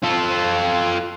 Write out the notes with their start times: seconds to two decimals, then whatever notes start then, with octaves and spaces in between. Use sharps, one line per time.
0.03 F4 A4